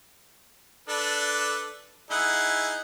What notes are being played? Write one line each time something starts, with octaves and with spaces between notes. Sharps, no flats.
D4 A4 B4
D#4 E4 G#4 F#5